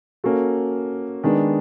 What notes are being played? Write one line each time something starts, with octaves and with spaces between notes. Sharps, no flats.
A#3 C#4 F#4 A4
D#3 G#3 B3 D4